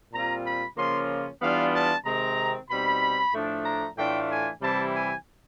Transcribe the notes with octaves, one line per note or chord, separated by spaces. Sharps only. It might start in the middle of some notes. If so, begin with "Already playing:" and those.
A#2 G3 C4 F4 A#5
B5
C#3 F3 A#3 C#4 F4 C6
E3 G3 B3 D4 F4 F5
A5
C3 D#3 G#3 C4 A#5
B2 G3 C4 D#4 B5
A2 F3 A3 D4
A#5
A2 E3 A3 D4 F4 G5
G#5
C3 E3 G3 C4 E4 A5
G#5